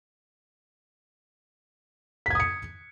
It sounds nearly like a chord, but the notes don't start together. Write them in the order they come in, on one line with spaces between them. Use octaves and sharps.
B6 G#6 D#6 C#7